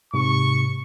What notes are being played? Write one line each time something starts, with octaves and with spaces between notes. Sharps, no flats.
G#2 C3 C#6